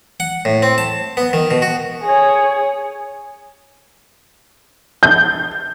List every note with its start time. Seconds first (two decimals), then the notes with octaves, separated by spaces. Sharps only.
0.20 F#5
0.45 A2
0.62 C4
0.78 A5
1.17 B3
1.33 D#3
1.51 B2
1.62 F#4
2.03 G#4 C#5
5.03 G6